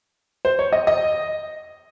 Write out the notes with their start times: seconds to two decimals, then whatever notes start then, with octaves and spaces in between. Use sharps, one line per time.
0.45 C5
0.59 C#5
0.73 D#5
0.87 D#5